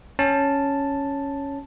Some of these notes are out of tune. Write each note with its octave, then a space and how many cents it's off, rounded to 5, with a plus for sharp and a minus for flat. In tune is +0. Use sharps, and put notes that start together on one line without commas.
C#4 +0 A5 +0